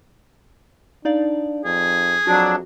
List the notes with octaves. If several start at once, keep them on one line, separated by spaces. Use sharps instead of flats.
D4 D#4 D5 F5
F2 G#4
F2 F#3 D4 F#4